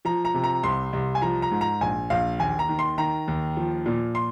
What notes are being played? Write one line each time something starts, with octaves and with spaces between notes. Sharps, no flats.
F3 A#5
A#5
C3
A#5
C2 C6
C2
G#5
F3 A#5
A#5
G#2
A#5
A#1 G#5
A#1 F5
D#2 G#5
A#5
D#3
C6
D#3 A#5
D#2
F3
A#2
C6